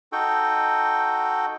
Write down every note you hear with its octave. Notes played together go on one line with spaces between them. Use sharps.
D#4 F#4 A4 G5